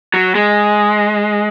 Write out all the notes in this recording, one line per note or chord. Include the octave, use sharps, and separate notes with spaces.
F#3
G#3